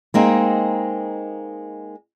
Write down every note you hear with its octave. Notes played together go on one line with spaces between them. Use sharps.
G#3 A#3 C4 D#4